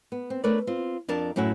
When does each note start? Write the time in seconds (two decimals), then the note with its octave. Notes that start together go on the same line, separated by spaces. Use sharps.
0.12 B3
0.30 C4
0.44 A3 D4 A#4 B4 C#5 D5
0.67 C4 F4
1.08 F2 D4 A#4 A5
1.36 F#2 A2 C#4 E4 F#4